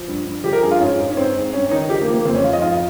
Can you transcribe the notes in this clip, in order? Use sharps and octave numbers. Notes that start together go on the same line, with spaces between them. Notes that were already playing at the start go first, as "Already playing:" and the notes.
Already playing: F3
G2
G2
F3 G4
A#4
G2 G#4
F4
G#2 C#4
G#2
C#4
G#2 C4
G#2
G2 C#4
C#4
D#3 D#4
F3 G4
A#3
F3
A#3
F2 C4
C#4
F2 F4
D#5
G#2 F4